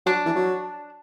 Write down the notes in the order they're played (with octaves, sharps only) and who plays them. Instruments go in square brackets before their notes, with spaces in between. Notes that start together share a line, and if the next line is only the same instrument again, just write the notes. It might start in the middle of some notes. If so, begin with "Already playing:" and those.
[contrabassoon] F#3 [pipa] D4
[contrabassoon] E3
F#3